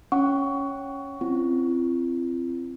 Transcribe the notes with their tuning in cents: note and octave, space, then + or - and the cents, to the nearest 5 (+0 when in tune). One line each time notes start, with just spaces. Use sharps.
C#4 +0 F#5 +0 C#6 +20
C4 +5 F4 -45